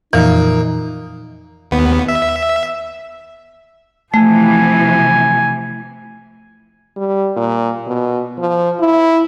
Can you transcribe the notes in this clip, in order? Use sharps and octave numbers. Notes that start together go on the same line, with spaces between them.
F2 A#2 E3 F3 D#4
D#2 B3
E5
C3 E3 F3 A3 G#5
G3
A#2
B2
F3
E4